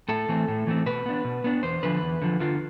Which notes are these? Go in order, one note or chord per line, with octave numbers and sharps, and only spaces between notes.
A2 A4
E3 A3 C4
A2
E3 A3 C4
B2 B4
B3 D4
B2
B3 D4
E2 C5
D3 F3 B4
E2
D3 F3
D3 F4